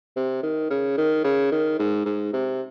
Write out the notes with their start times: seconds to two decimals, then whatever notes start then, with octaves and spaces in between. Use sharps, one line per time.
0.16 C3
0.43 D#3
0.70 C#3
0.98 D#3
1.24 C#3
1.51 D#3
1.79 G#2
2.06 G#2
2.33 C3